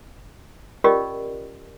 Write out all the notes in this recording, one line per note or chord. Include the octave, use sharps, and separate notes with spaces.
C#4 F4 G4 A#4 D5 D#5